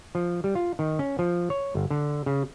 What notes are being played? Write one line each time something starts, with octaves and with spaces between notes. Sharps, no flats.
F3
G3
F4
D#3
C#4
F3
C#5
G1
D3
C#3